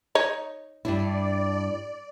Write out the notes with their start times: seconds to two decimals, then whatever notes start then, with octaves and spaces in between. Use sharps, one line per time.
0.15 D#4 C#5
0.85 G2 D4 E4 D5